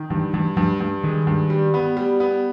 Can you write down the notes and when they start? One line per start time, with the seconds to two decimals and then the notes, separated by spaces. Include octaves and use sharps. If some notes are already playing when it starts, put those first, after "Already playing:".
Already playing: D#3
0.10 G2 E3
0.33 G2 E3
0.56 G2 F3
0.80 G2
1.03 D#3 G#3
1.27 G2
1.50 G3
1.74 B3
1.97 G3
2.20 B3